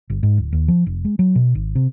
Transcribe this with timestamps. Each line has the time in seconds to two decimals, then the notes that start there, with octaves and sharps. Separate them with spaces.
0.10 G1
0.23 G#2
0.38 D1
0.53 D#2
0.68 F3
0.86 F1
1.05 G#3
1.19 F#3
1.35 B2
1.55 G#1
1.75 C3